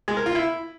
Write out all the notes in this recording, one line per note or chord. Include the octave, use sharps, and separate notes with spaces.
G#3
A#4
F4
E4